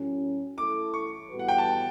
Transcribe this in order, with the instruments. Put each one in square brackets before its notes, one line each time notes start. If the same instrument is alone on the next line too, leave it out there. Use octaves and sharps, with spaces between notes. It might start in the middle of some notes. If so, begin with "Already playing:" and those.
Already playing: [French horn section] A2 F#3 C#4
[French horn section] A3 E4 A4 [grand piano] D6
[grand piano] C#6
[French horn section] A2 G3 B3 F#4 B4
[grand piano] F#5
G5
A5